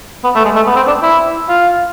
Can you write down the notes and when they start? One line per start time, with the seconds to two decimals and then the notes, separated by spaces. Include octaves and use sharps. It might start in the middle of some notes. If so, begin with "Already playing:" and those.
0.24 B3
0.35 A3
0.45 G#3
0.56 A3
0.67 B3
0.76 C4
0.87 D4
1.03 E4
1.49 F4